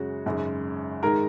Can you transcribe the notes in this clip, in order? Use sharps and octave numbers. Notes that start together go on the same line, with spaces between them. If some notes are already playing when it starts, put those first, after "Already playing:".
Already playing: F#2 C#3 G#3 C#4 F#4
G#1 F#2 C#3 G#3
G#2 D#3 G#3 A#4 A#5